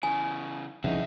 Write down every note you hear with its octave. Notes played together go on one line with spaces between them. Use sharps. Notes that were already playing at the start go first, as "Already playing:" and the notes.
C#3 E3 G#5
C2 F2 C#3 E3 D#4 E5 F#5